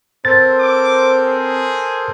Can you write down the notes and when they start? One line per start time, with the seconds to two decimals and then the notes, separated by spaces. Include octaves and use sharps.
0.25 C4 A4 A#4 C5 A6
0.60 D6
1.24 G#4